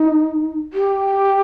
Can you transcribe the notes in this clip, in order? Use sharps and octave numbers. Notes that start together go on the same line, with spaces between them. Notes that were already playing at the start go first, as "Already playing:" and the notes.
Already playing: D#4
G4